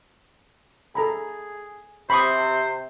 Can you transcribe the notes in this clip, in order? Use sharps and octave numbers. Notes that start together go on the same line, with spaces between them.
G#4 A4 A#5 B5
C3 C4 C5 B5 C#6 D#6